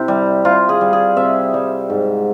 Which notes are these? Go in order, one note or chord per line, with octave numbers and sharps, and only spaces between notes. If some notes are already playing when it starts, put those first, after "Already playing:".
Already playing: C3 E4
G3
C3 F4
G#4
G3
G#4
C3 E5
G3
G#2